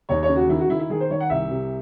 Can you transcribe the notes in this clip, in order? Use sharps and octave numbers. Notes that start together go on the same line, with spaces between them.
D#2 C#5
C#5
C#3
F#4
D#3 E4
F#4
D#3 E4
E4
D#3 G#4
C5
D#3 C#5
F#5
C2 E5
C3